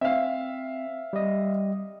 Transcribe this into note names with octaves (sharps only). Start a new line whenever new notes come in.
C4 E5 F5
G3 D#5